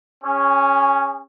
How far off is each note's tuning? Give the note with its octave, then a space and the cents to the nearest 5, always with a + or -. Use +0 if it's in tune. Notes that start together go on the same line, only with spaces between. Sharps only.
C#4 +0 G#4 -30